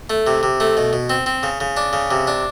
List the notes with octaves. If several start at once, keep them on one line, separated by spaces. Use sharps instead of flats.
A3
C3
C3
A3
B2
B2
C4
C4
C#3
C#3
D4
C#3
C3
D4